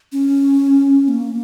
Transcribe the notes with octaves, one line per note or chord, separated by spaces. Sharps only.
C#4
A#3